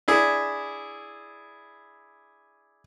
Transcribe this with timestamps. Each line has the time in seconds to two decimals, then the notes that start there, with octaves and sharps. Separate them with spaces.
0.08 D4 E4 G#4